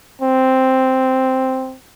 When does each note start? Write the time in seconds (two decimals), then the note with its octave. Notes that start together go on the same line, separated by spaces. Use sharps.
0.21 C4